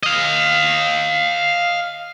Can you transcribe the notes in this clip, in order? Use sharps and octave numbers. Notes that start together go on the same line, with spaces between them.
D#5 F5